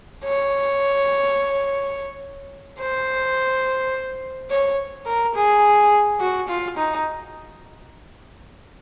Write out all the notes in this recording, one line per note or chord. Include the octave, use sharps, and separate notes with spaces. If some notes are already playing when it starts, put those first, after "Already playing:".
C#5
C5
C#5
A#4
G#4
F#4
F4
D#4